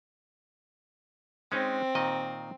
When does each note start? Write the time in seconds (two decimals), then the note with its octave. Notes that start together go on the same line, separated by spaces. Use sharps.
1.52 G#3 C4 C#4 D#4
1.95 A#2 D#3 D#5